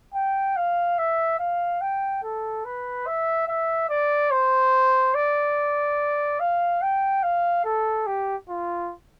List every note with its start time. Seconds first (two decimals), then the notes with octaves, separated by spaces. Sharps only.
0.14 G5
0.57 F5
0.98 E5
1.39 F5
1.81 G5
2.23 A4
2.65 B4
3.07 E5
3.48 E5
3.89 D5
4.31 C5
5.14 D5
6.40 F5
6.82 G5
7.23 F5
7.65 A4
8.07 G4
8.49 F4